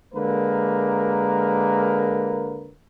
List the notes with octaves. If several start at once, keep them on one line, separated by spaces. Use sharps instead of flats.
D3 G#3 A#3 A#4 B4